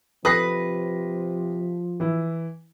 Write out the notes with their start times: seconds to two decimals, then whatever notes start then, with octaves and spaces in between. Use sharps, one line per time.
0.25 C3 F3 B4 D#6 A#6 C7
2.00 E3 E4